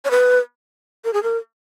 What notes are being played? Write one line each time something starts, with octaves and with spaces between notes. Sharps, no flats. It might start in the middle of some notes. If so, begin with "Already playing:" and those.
C#5
B4
A#4
G#4
A#4